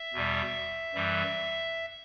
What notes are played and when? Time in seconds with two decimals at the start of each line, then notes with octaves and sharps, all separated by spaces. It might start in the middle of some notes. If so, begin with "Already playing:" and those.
Already playing: E5
0.13 E2 B2 G3
0.95 F#2 E3 G3